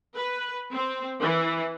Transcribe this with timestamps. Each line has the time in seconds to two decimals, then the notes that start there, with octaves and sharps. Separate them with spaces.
0.16 B4
0.73 C4
1.22 E3